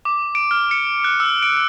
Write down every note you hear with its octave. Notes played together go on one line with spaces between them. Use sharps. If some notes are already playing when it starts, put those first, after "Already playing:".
D6
D7
F6
C#7
F#6
E6
D7